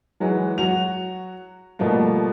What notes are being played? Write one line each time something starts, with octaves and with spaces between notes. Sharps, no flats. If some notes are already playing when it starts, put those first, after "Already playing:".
E3 F#3 G#3 B4
F#3 F#4 F7
B2 F3 G3 A3 A#3